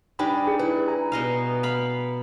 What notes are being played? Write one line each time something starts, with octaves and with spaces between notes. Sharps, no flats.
G3 D4 D#4 G5 G#5 B5
G#4
E4 B4
G#5 A#5
B2 D#5 F5
F5 B5